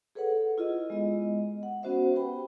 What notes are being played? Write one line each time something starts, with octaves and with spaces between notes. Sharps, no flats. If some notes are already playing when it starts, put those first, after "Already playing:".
G#4 A4 B4 C#5 F#5
E4 F4 G#4 D#5
G#3 B3 D#5
F#5
B3 C#4 F#4 C5 E5 F#5
G4 B4 G5 B5